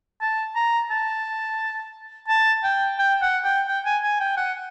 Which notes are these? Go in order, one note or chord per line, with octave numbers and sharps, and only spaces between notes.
A5
A#5
A5
A5
G5
G5
F#5
G5
G5
G#5
G#5
G5
F#5